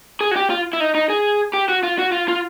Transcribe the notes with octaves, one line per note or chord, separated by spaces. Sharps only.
G#4
F#4
G4
F4
E4
D#4
D#4
G#4
G4
F#4
F4
F#4
F4
F4